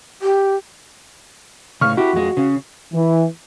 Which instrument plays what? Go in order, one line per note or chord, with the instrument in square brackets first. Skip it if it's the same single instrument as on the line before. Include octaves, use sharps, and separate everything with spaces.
[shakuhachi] G4
[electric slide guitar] A2 C#3 [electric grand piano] C#6 F6
[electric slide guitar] E4 G4 [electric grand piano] F#4
[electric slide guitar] F2 G#3
C#3
[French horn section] E3